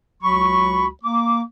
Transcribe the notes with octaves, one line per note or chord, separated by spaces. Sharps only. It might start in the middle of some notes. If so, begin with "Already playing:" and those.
C#2 F#3 F#4 B5 C#6
A#3 D6